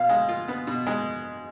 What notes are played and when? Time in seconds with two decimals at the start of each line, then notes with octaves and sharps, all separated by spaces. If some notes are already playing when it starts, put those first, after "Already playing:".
Already playing: B2 B3 F5
0.09 G#3
0.29 F4
0.48 B3
0.67 B2
0.87 G#3